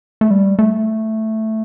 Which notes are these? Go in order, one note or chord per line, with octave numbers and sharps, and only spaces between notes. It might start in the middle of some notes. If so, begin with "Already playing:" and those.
A3
G3
A3